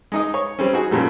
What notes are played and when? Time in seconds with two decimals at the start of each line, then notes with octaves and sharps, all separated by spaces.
0.12 G#3 D#4 D#5
0.34 C#5
0.59 G3 C4 C#4
0.73 D#4 F#4 G#4
0.91 F#2 A#2 G3 A3